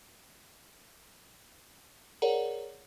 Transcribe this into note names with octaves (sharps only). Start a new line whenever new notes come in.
G#4 A#4 C#5 D5 F#5 A#5